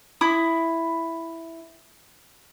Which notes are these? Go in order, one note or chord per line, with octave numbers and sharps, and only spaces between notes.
E4 B5 D#6